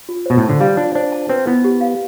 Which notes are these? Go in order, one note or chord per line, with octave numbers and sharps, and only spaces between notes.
F4
B2 C5
A2
A5
D3
G3 F5
D4 F4
D4 C5
A5
C4 B4
B3 E4
G4
F5